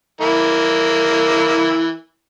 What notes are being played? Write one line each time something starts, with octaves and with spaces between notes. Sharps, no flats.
E3 A#3 E4